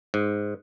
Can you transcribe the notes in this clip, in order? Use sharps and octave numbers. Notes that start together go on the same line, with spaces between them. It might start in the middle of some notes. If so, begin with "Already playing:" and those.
G#2